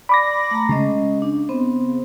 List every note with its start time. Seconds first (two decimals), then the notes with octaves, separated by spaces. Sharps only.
0.09 D5 B5 D6 A#6
0.51 A3 A#5
0.69 C#3 G#3 C#4 D#5
1.22 D4
1.49 B3 C4 C5